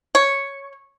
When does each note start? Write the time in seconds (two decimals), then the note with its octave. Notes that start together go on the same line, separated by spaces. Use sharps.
0.15 C#5